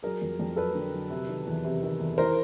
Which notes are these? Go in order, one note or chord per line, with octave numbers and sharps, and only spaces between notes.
F#3 G#4 A#4
F2
F2
F#3 A4 B4
D3
F#3
C3
D#3
E2
C3
D#3
E2
E3 A#4 C5